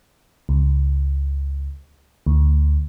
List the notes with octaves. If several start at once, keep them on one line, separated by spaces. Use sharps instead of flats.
C#2
D2